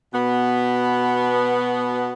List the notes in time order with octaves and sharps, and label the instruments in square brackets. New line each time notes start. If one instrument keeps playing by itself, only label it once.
[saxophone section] B2 B3